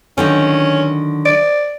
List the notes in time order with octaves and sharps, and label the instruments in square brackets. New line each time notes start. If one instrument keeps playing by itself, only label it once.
[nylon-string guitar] D3 D#3 F#3 [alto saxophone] C#4
[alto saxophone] D5